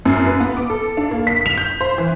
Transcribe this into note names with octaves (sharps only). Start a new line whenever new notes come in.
F#2
B4
B3
D6
A4
D4
A#3
B6
F7
G6
C5
E3